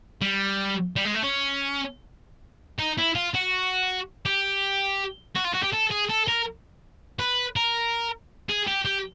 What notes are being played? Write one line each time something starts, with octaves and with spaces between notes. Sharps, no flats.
G3
G3
G#3
A3
C#4
D#4
E4
F4
F#4
G4
F#4
F4
F#4
G4
A4
G#4
A4
A#4
B4
A#4
G#4
G4
G4